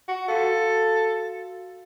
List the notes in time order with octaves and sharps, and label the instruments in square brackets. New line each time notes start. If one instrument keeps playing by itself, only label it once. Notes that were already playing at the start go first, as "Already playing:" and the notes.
[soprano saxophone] F#4
[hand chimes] F#4 F5 [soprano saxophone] A4